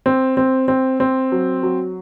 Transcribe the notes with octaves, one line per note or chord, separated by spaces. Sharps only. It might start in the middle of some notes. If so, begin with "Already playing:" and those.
C4
C4
C4
C4
F#3
F#3